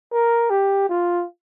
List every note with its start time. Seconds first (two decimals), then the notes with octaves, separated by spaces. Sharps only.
0.12 A#4
0.50 G4
0.89 F4